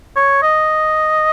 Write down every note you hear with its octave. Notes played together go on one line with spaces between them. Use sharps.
C#5
D#5